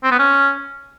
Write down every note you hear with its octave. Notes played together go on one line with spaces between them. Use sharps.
C4
B3
C#4